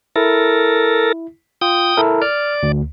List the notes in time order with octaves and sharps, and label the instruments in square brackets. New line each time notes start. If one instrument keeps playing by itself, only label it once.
[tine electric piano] E4 [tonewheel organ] A4 A#4
[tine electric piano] F4 [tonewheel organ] G5 D#6
[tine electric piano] E4 A4 A#4
[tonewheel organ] D5 [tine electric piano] F6
[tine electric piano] D2